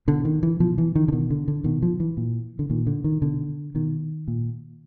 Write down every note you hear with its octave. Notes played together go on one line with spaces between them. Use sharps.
B2 D3
D#3
E3
B2 F3
E3
D#3
D3
B2 D#3
D3
D3
B2 D#3
F3
E3
A#2
D3
A#2 D#3
D3
D#3
B2 D3
B2 D#3
A#2